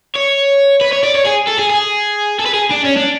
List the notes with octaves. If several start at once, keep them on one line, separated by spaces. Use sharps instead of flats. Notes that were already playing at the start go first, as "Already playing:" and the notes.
C#5
B4
C#5
D5
C#5
G#4
A4
G#4
G#4
A4
B4
G#4
D4
C#4
D4